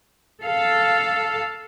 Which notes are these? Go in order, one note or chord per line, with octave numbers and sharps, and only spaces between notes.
A4 F5